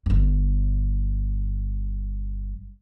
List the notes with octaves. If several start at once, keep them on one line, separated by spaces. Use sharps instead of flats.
G1 G2